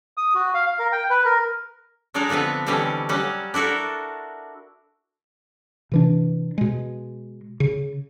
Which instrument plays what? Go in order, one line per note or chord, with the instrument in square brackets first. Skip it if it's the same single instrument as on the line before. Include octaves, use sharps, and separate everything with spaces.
[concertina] D#6
F#4
F5
F5
A#4
G5
B4
A#4
[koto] F#3 G#3 D4 D#4 A#4 D5
D3 F3 B3 C4 B4
B2 D3 E3 G3 C4 C#4
F#3 G3 C#4
D4 E4 F#4 A4 A#4
[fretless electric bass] C3 E3 D4
B2 G#3
C#3